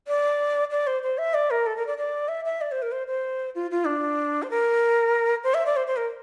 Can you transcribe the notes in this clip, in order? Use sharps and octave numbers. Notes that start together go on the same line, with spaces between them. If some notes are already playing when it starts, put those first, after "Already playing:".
D5
D5
C5
C5
E5
D5
A#4
A4
A#4
D5
D5
E5
E5
D5
C5
A#4
C5
C5
F4
F4
D4
C5
A#4
C5
E5
D5
C5
C5
A#4